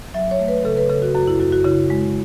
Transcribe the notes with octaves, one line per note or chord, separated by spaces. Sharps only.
F#3 E5
C#5
A3
B4
C#3 A4
B4
C#3 A4
F#4
F#2 F#4
E4
F#2 F#4
F#4
C#3 E4
G#3